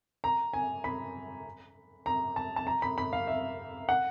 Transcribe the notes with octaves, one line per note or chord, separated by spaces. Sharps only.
A#5
G#5
B5
A#5
A5
A5
A#5
B5
B5
F5
E5
F#5